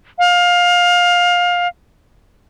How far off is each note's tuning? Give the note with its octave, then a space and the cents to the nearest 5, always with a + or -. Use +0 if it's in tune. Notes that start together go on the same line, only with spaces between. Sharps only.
F5 +20